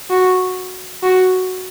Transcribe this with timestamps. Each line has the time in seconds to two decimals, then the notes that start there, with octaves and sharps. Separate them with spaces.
0.10 F#4
1.03 F#4